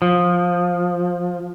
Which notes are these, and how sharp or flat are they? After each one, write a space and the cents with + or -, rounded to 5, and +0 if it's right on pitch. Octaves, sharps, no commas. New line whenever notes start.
F3 +15